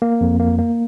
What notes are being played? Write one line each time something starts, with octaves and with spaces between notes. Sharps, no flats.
A#3
F2
A#3
A#3